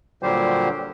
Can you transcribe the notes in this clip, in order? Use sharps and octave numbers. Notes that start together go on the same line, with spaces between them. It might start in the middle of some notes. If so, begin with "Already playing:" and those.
A#2 D3 F#3 G3 G4 C5